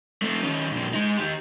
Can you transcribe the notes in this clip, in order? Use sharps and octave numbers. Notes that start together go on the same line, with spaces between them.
A3 C4
D#3 C#4
A#2 D3
G#3 D#4
D#3 G4